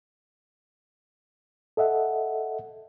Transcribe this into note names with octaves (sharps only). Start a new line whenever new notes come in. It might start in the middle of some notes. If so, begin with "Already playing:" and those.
A4 D#5 E5 F#5